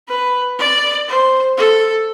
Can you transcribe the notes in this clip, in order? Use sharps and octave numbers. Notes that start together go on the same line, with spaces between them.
B4
D5
C5
A4